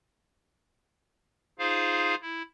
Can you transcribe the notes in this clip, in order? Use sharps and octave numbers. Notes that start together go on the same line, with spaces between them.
D#4 F4 G#4 C5 F5
E4